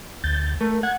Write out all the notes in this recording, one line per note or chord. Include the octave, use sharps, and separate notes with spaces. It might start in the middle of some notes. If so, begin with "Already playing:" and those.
D2 G6 A6
A3 A#4
F#5 G#6